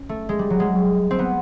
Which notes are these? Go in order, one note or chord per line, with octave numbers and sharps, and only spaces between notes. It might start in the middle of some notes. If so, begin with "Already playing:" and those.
Already playing: C#4
A3
G#3
G3
F#3
G#3
C4
B3